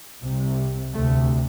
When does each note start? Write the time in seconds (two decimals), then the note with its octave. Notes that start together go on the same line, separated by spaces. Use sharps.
0.21 C2 C3
0.93 D2 C3 A3